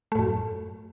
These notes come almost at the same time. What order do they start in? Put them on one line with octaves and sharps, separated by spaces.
A3 A2 F#2